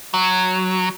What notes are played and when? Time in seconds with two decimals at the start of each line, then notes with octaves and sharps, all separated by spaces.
0.14 F#3